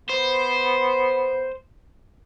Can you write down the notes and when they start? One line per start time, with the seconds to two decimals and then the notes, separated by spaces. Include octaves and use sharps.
0.09 B3 C5